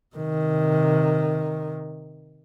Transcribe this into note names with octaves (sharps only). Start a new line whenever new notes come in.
C3 D#3